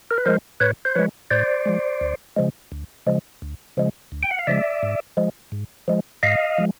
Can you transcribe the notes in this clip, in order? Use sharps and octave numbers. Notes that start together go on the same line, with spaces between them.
A#4
B4
F3 G#3 A#4 C5
A2 B4 C#5
C5
F3 G#3 B4 C#5
A2 C5 D5
F3 G#3
D2
C#3 F3 G#3
D2
C#3 F3 G#3
D2
C#3 F3 G#3
D2
G5
F#5
F5
C#3 F3 G#3 D5 E5
G#2
F3 G#3
G#2
F3 G#3
G#2 D#5 F5
F3 G#3